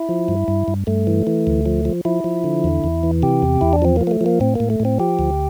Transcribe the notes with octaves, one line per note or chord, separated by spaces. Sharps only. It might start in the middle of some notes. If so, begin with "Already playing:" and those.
Already playing: E4
F3
G2
G2
G2
G2 A3
E3
E3
D2
F3
F3
F3 E4
F3
D3
E2
E2
E3
C3 G4
E2
E2 E4
D4
F3 C4
A#3
F3
A#3
A3
F3
A#3
A2 C4
A2 A#3
A3
A2
C4
F3 G4
D2